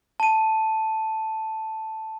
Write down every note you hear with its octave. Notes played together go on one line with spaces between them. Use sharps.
A5 D#7